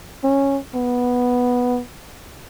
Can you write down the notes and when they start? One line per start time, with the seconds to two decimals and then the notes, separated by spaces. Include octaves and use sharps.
0.24 C#4
0.75 B3